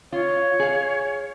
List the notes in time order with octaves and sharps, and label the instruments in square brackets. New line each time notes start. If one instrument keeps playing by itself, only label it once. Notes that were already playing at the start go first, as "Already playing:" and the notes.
[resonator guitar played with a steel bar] F4 [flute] C#5
[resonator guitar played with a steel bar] G#4 F5